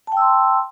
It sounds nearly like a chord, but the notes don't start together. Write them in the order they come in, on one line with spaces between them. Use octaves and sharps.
A5 G5 E6 C6